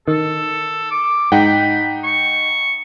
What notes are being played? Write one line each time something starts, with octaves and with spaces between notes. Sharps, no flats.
D#3 A4
D6
G#2 D#4 F#5 G5 B5
C#6